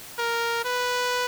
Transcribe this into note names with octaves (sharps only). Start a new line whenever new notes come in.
A#4
B4